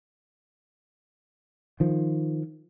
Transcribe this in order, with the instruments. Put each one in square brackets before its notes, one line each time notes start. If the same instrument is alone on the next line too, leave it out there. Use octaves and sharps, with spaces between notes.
[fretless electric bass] D#3 F3